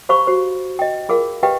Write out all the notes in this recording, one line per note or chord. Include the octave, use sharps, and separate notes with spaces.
G4 C5 F5 B5 C#6
F#4 C5
D#5 G5
F4 G#4 A#4 F5
G4 B4 D#5 F5 G5